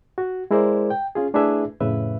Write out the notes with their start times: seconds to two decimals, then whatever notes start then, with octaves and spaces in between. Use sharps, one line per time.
0.18 F#4
0.51 G#3 E4 G#4 A#4 C5 D5
0.90 G5
1.15 C#4 F4 G#4
1.34 A3 D4 E4 G#4 B4 E5
1.80 F2 A2 C#3 B4 E5